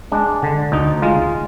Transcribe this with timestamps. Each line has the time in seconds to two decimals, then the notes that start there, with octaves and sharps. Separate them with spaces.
0.12 G#3 D4
0.43 D3
0.72 D2 D#4
1.02 G#3 F4